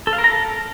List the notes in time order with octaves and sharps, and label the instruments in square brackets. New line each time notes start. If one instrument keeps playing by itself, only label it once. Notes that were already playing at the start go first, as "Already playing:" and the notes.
[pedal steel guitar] A4
F5
A#4
A#5
A4